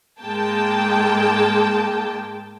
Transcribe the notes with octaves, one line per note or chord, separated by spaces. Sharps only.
G#2 G#3 A#3 G5 A5